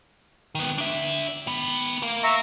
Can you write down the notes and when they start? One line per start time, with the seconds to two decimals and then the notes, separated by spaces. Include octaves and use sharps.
0.55 D#3 B3
0.78 D4 E5
1.47 D#3 B3
2.03 A#4 F5
2.24 E5 A#5 C#6